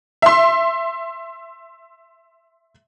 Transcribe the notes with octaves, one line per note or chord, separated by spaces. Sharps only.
E5 C6